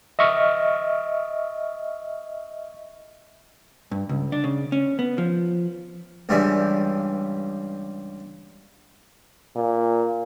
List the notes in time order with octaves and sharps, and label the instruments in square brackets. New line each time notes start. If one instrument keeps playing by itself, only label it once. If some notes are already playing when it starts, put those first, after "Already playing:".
[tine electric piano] D#5 E5 C#6 F6
[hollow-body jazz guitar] G2
C#2
D4
C#3
C#4
B3
F3
[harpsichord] C#2 G2 C#3 E3 G3 E5
[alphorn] A#2